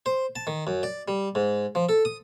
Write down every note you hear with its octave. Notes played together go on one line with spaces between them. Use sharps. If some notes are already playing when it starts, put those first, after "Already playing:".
C5
A5
D#3
F#2
D5
G3
G#2
F3
A4
D#6